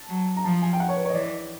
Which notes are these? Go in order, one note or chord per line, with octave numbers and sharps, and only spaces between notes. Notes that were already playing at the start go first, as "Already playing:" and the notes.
Already playing: A5
F#3
A#5
F3 A5
G#5
G5
F#5
C#5
B4
C#5
D#5
E3 D5